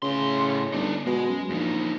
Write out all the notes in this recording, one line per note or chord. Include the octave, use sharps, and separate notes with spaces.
A2 C#3 C6
G1 D#4 D5
B2 G#3
F#2
A#1 E2 D#4